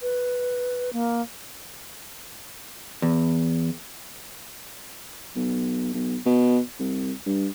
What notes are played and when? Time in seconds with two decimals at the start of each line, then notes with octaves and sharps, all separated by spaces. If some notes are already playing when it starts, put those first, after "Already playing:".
0.01 B4
0.93 A#3
3.02 E2
5.36 B1
5.94 B1
6.26 B2
6.79 C2
7.26 G2